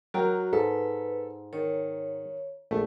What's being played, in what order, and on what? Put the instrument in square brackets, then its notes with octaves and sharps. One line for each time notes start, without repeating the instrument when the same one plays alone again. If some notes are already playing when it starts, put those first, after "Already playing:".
[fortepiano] F#3 A#4 G5 [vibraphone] F#4
[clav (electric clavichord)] G#2 [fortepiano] A4 [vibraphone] B4
[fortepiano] D#3 [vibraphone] C#5
[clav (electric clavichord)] A#1 [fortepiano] A3